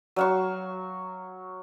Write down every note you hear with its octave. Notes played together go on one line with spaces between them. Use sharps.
F#3 F5 C#6